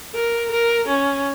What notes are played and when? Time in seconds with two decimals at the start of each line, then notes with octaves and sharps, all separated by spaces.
0.14 A#4
0.51 A#4
0.88 C#4